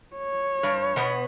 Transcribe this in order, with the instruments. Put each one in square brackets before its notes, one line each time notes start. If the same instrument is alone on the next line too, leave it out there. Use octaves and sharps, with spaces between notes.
[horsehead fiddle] C#5
[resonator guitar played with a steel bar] G2
B2 B3